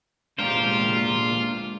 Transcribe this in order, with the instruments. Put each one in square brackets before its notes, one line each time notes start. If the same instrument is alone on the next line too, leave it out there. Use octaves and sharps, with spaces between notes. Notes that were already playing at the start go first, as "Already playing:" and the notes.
[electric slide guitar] A#2 B3 D4 [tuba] G#3 [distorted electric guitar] F4 [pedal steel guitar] G4 A#4 C5